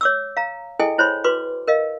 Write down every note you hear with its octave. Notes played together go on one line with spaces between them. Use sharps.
C#5 D6 E6
F5 A#5
E4 G#4 A4 D#5 G5 G#5
E4 C5 C#5 B5 C6
F#4 B4 C6 D6
A#4 D#5 F5